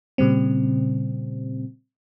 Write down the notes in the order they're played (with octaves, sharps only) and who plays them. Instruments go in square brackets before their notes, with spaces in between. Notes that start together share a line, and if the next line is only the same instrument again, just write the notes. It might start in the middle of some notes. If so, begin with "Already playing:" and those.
[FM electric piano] A#2 C#3 G3 C4